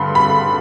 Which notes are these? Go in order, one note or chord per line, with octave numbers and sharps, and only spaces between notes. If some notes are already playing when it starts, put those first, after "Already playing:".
Already playing: G2 D3 B5 C6
B5